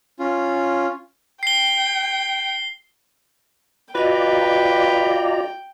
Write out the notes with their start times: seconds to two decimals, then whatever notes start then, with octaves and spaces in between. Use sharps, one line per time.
0.19 C#4 F4
1.43 G5 C7 G7
3.95 F4 F#4 B4 D5 D#5 G5 A#5